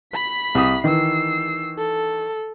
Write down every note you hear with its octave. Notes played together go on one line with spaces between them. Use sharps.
B5 B6
C2 D#6
D#3 E3 E6 C7
A4